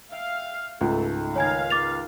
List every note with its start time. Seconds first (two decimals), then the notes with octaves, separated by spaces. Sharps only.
0.12 E5 F5 G5
0.81 C#2 G#2 A3
1.36 D#3 A#3 D#4 C#5 F5 G#5 G#6
1.70 D6 A6 F7